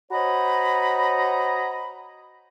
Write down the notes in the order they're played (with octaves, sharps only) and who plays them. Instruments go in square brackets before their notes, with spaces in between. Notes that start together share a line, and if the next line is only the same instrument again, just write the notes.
[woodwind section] F#4 C5 C#5 D#5 A#5 B5